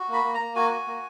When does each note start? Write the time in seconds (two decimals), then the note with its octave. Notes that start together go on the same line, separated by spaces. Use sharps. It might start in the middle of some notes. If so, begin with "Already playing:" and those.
Already playing: F#4
0.08 A#3 B5
0.24 A#3
0.34 A#3 A#5
0.56 F#4 G#5
0.71 F#4
0.87 A#3